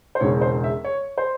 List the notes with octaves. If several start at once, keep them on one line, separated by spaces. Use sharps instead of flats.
C5
E1 E2 C#3 C#5
C5
E5
C#5
C5